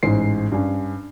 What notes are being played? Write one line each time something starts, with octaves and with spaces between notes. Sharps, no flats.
A1 G#2 C5 C7
G2 C#4